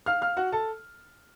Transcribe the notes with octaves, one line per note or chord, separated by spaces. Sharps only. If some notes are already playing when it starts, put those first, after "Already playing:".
F5 F6
F5 F6
F#4 F#5
A4 A5